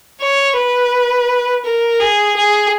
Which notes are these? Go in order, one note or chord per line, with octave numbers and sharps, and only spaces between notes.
C#5
B4
A#4
G#4
G#4